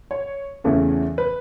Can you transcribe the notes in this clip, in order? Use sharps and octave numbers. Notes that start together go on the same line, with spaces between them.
C#5
E2 C#3 E3 A3 C#4
B4